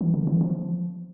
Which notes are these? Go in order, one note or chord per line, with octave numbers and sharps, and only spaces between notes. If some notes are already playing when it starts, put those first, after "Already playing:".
E3
D3
E3
F3